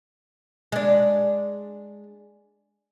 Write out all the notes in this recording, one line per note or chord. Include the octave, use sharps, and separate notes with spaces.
G#3 D4